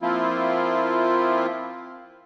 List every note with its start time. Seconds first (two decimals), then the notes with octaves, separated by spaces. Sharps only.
0.02 F3 A#3 C4 E4 F4